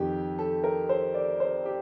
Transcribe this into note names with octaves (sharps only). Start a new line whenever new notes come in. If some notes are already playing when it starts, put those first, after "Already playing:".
Already playing: F2 D#3 G4
A4
A#4
C5
D5
C5
G4